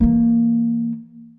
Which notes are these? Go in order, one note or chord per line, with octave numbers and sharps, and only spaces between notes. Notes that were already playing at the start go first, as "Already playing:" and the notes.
E3 A#3